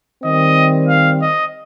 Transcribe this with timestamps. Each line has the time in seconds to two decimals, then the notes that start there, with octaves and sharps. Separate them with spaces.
0.22 D#3 G3 C4 D#5
0.87 F5
1.21 D#5